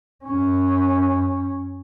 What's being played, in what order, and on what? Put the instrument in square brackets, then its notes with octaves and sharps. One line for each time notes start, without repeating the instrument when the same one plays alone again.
[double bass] F#2 C#4